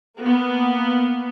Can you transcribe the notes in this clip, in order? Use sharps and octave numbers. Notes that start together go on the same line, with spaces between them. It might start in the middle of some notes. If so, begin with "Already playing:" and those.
A#3 B3